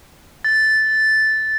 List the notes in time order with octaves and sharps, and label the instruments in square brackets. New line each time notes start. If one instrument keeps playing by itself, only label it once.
[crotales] A6